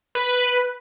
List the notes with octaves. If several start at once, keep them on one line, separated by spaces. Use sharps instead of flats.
B4